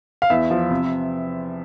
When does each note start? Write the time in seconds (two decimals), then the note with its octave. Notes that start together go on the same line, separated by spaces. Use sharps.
0.22 F5
0.30 E2 E5
0.51 F3
0.71 C3